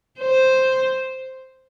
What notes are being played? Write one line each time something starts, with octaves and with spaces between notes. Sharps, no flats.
C5